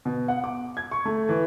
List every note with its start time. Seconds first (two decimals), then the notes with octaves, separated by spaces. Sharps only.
0.05 B2
0.28 F#5
0.44 D6
0.77 G#6
0.91 C#6
1.05 A3
1.29 E3